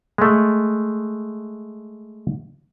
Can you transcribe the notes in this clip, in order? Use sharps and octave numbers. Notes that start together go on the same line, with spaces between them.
G#3 A3